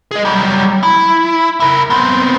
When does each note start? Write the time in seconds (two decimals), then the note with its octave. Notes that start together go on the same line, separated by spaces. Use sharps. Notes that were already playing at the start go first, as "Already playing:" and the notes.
0.11 G#4 D#5
0.25 F#3 G3
0.83 E4
1.60 E4 A#4
1.90 B3 C4